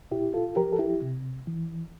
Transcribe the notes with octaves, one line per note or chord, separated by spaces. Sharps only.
A#2 E4 G4
F4 A4
F3 G4 A#4
A4
E4 G4
C3
E3